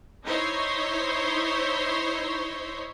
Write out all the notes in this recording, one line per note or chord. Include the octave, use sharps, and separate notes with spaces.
D#4 E4 C5 C#5